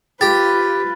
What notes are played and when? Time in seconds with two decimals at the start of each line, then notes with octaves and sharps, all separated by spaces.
0.21 F4 G4 B4 A6